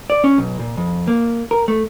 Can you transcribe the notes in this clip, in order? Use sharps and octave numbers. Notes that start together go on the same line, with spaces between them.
D5
C#4
B1
A#2
F2
A#3
A#4
A3